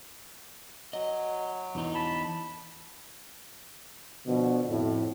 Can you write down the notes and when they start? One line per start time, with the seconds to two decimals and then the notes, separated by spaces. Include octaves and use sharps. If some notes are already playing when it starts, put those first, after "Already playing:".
0.93 F#3 D#5
1.75 E2 E3 D#4
1.95 A5 B5
4.27 B2 D3 F3
4.69 F2 A2